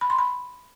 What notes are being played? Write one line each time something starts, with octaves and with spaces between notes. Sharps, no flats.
B5
C6
B5